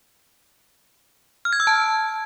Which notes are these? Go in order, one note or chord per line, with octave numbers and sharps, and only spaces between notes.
F6
G#6
E6
A5